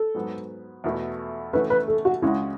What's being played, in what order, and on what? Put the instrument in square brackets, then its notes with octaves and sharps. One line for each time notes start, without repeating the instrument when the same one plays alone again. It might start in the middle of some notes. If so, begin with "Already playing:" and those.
Already playing: [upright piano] A4
[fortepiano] G#2 F#3 B3
E2 B2 A3 E4
[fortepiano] E3 A3 C#4 F#4 A4 [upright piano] B4
[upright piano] B4
A4
F#4
[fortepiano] C#2 C#3 G#3 C#4 F#4 [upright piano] E4